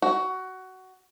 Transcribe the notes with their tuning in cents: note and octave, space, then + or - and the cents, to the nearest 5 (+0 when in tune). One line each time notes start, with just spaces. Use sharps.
F#4 +15